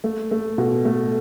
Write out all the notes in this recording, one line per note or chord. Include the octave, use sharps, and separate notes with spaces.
A3
A3
B2
A3